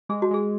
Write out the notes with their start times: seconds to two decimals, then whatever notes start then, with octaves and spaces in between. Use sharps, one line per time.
0.09 G#3 G#4
0.22 F#4
0.31 G#3 G#4